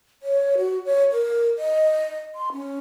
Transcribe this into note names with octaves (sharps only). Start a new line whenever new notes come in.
C#5
F#4
C#5
A#4
D#5
C6
C#4